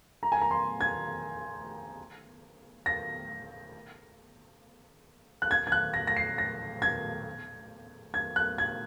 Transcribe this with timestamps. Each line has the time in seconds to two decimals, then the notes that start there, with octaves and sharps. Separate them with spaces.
0.23 A#5
0.32 G#5
0.41 A#5
0.51 C6
0.81 G#6
2.86 A#6
5.42 F#6
5.51 G#6
5.67 G#6
5.72 F#6
5.94 A#6
6.07 A#6
6.17 C7
6.38 A#6
6.82 G#6
8.14 G#6
8.36 F#6
8.58 G#6